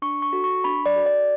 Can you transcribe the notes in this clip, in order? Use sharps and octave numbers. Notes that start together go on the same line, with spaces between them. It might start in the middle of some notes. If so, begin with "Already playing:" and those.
D4 C#6
C#6
F#4 A4
C#6
D4 B5
D5
F#4 A4
D5